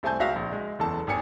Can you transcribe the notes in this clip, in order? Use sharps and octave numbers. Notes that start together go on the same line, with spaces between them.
C2 A3 C5 G#5 A5 G6
C#2 F#4 E5 F5 A#6 F7
A#1
G#3
F#1 E2 A4 A5
G#1 D#2 G#5 C#7